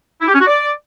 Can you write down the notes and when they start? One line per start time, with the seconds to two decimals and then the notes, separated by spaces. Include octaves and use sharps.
0.21 E4
0.28 G4
0.34 C#4
0.40 F#4
0.47 D5